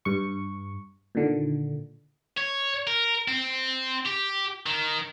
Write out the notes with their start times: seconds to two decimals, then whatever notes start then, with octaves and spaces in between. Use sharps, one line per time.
0.05 G2 C#6
1.15 A#2 D3 D#3
2.38 C#5
2.87 A#4
3.28 C4
4.06 G4
4.67 D#3